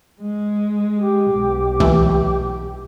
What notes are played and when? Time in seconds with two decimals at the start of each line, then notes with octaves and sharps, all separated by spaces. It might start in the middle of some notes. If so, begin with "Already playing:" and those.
0.21 G#3
0.96 G4
1.32 B1 B2
1.80 C#2 E3 A3